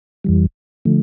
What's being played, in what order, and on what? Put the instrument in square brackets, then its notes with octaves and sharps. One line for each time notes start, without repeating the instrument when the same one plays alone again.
[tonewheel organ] F2 E3 G3
D3 F3 A3